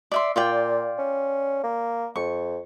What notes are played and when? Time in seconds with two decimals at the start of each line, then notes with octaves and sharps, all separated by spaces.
0.12 D5 E5 C6
0.36 A#2 F4 D5 G5
0.98 C#4
1.63 A#3
2.16 F2 C#6